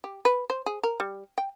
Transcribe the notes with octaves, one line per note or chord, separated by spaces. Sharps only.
G4
B4
C5
G#4
A#4
G3
G5